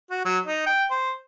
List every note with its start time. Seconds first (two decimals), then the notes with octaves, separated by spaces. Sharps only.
0.10 F#4
0.25 F#3
0.46 D#4
0.66 G5
0.91 C5